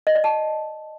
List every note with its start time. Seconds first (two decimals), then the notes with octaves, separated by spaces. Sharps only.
0.07 D#5
0.15 D5
0.24 A5